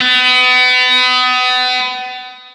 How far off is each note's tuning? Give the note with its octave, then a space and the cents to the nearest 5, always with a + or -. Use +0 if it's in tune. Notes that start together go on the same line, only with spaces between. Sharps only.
B3 +35